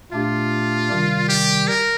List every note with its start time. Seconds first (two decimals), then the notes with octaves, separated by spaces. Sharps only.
0.12 A#2 A3 D4 F4 G4
0.90 C3 D#3 G3
1.29 G4
1.68 A#4